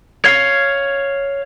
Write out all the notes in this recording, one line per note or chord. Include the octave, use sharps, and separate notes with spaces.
C#5 F5